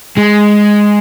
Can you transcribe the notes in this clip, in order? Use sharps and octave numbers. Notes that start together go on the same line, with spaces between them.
G#3